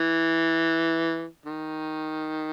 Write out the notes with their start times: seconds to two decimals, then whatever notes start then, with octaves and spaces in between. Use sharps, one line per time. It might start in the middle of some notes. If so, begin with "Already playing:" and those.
Already playing: E3
1.45 D#3